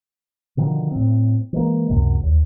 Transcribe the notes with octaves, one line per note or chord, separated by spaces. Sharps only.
B2 D3 D#3 F3
A2 C4
E3 G#3 A#3
C#2 F#2 C3
D#2